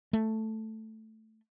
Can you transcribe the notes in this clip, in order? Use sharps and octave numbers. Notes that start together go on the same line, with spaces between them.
A3